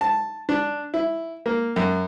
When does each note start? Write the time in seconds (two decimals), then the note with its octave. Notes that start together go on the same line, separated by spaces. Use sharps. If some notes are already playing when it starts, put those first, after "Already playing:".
0.01 A5
0.49 D4
0.94 E4
1.46 A#3
1.76 F#2